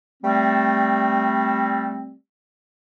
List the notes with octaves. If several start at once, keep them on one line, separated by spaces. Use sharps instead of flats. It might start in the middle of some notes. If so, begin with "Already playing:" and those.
G3 A3 C4